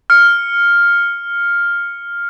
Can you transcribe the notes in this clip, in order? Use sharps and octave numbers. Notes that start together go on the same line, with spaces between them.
F6 C#7